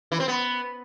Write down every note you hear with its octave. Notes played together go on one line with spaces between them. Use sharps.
E3
C4
B3